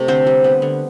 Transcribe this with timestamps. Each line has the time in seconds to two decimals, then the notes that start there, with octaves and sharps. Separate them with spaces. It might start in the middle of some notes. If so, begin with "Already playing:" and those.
Already playing: C3 A3
0.08 D3 C4 C5
0.27 G3
0.44 B3
0.62 D3